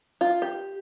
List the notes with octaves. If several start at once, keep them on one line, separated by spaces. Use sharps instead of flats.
F4
G4